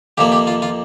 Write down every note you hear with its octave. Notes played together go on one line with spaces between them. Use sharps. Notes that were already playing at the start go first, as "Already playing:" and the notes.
F2 C3 F3 A#3 G4
G4
F4
F4